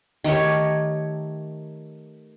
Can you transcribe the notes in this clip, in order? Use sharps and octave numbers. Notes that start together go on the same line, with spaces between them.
D#3 A3 G4 C#5